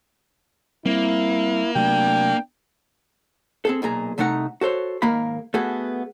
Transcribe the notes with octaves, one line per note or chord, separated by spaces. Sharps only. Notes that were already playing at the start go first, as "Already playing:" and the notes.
G3 A#3 C4 E4
C3 F#3 A3 D4 G5
C4 G#4 A4
B1 A#2 G#4 A#5
C2 C3 A3 D#4 F#5 A#5
F#4 A4 C5 C#5
D#2 G#2 A#3 A#4 F5 B5
A3 B3 F#4 G#4 A4